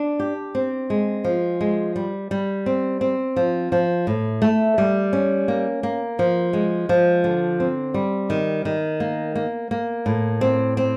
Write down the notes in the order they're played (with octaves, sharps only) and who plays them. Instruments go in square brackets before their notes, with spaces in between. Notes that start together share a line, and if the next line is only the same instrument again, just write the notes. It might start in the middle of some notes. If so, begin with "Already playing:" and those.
Already playing: [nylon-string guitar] D4
G4
C4
G#3
F3
G#3
G3
G3
C4
C4
F3
F3
A2
A3
G3
C#4
A#3
A#3
F3
G#3
F3
D3
C4
G3
D#3
D#3
A#3
A#3
A#3
A2
C4
C4